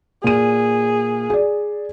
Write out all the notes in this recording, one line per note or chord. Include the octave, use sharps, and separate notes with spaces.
A#2 G#4 D#7
G#4 D5